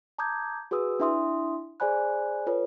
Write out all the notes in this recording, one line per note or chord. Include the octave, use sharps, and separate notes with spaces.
A5 A#5 D6 D#6 G6 G#6
F#4 G#4 B4 D#6 E6
D4 E4 E5 C6 D#6
G#4 C5 D5 G#5 B5 F#6
F4 A4 B4 C#5